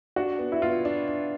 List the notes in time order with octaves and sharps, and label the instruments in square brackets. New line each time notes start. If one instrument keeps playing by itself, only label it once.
[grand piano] D4 [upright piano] F#4
[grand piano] B3
[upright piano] E4
[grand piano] B3 [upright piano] F4
[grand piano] D4
D4